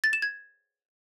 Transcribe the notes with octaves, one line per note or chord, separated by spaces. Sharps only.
A6
E7
G#6